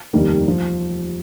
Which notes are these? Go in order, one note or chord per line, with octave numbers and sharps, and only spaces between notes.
F1 D#2 D#3 G3 A#3
F3